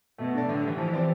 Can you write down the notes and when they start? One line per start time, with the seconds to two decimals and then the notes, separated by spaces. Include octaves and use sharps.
0.18 B2 A3
0.34 D4 A4 D5
0.49 A2 D3
0.63 E3 G3
0.77 E3 F3
0.93 C4 G4 D5